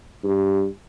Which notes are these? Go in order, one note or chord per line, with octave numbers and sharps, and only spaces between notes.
G2